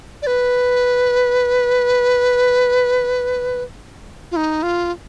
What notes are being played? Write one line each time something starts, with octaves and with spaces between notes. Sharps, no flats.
D5
B4
F4
D#4
F4